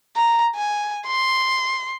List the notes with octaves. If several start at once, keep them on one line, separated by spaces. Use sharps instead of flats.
A#5
G#5
C6